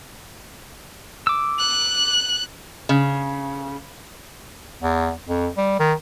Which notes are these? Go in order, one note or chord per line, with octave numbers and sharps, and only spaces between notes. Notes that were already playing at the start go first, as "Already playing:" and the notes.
D6 E6
F#6
C#3
E2
F2
G3
D#3